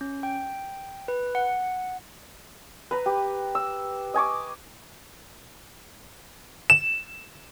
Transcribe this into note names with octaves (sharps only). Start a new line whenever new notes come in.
C#4
G5
B4
F#5
B4 A#5
G4
E6
D#5 G#5 C#6 D6
E7